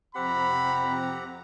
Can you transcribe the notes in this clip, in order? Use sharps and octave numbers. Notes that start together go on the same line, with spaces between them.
F2 C3 C4 G4 F#5 A#5 B5